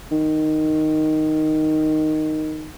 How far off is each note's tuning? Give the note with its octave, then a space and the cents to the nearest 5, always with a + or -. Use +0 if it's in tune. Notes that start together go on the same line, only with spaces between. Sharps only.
D#3 -5